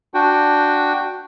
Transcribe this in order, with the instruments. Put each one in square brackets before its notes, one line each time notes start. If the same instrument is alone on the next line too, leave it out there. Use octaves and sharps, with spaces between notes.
[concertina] D4 F#4 G5